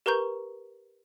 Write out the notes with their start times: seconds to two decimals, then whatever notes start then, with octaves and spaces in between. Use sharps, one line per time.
0.06 G4 A#4 B4 A#5 C#6 G6